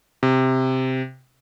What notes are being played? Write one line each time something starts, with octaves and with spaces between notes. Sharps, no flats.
C3